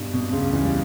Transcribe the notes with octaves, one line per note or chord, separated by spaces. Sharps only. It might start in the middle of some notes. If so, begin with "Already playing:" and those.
Already playing: G2 B2 G3
B2
C#2 C#3
E2 E3
G3